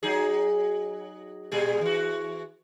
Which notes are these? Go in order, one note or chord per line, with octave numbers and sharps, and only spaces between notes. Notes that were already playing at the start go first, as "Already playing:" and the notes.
F#3 D#4 G#4
A#2 G3 G#4
E3 F#4